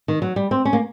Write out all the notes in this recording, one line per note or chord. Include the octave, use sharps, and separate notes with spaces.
D#3
F#3
G3
C4
C#4
A#3